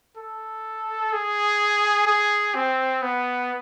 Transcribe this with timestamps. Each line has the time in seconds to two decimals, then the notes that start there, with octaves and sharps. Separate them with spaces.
0.17 A4
1.12 G#4
2.07 G#4
2.55 C4
3.02 B3